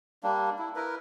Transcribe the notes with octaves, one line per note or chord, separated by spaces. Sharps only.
G3 A#3 D4
E4
E4 A#4 B4